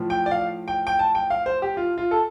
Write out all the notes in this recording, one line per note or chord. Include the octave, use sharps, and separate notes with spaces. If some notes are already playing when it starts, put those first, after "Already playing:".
Already playing: A2 F3
G5
D5
F5
G5
G5
A5
G5
F5
C5
G4
F4
F4
A4